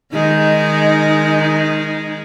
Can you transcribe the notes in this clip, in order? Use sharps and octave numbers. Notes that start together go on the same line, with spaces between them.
D#3 G#3 D#4